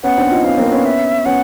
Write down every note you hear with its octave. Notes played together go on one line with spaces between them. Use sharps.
B3 C#4 F#5
C4 D4
D#4 F4
B3 C#4 F5
A#3 C4
B3 C#4
E5
B3 C#4 F#5